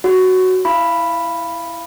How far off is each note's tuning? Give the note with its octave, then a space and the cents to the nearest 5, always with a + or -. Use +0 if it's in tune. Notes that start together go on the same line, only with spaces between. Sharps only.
F#4 +5 C#5 +0
E4 +0 F5 -25 B5 +0